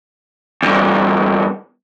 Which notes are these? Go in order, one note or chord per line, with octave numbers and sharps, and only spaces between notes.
E2 G2